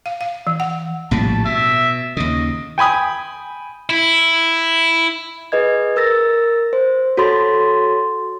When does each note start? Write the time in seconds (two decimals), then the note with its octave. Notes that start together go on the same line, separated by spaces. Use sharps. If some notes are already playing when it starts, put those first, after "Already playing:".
0.06 F5
0.21 F5
0.47 E3
0.60 F#5
1.11 A#1 A2 G3 A5
1.45 B2 E5
2.17 D#2 C#3 D#5
2.78 G5 G#5 B5 D#6
3.90 E4
5.52 G#4 B4 D#5 G#6
5.96 A#4 E6 A6 A#6
6.73 C5
7.17 F#4 A4 C#5 B5 C6 A6